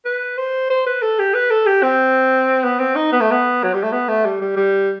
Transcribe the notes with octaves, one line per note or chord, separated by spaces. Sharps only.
B4
C5
C5
B4
A4
G4
B4
A4
G4
C4
B3
C4
D#4
B3
A3
B3
F#3
G3
A3
B3
A3
G3
G3
G3